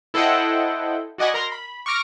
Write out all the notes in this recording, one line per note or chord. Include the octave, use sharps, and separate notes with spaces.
E4 A4 C5 D#5 F#5 G5
F#4 D5 D#5 F#5 G#5 B5
A#4 A#5 C6
B5
C#6 D6 F6 A#6 D7